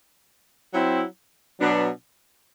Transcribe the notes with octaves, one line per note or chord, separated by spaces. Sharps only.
F#3 C4 E4
B2 F#3 B3 D4